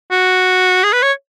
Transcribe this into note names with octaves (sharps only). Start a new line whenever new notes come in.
F#4
G#4
B4
C#5